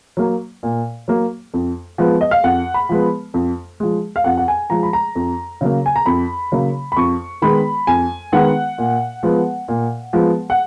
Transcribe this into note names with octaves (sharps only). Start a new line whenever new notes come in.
F#3 A#3
A#2
F#3 A#3
F2
F3 G#3 B3
D#5
F5
F2 F#5
B5
F3 G#3 B3
F2
F3 G#3
F5
F2 F#5
F#5
G#5
F3 G#3 A#5
B5
A#5
F2
C#3 F#3 A#3
G#5
A#5
F2 B5
C#3 F#3 A#3
B5
F2 C#6
D#3 G#3 B3 B5
F2 G#5
D#3 G#3 B3 F#5
A#2
F3 G#3 B3
A#2
F3 G#3 B3
F#5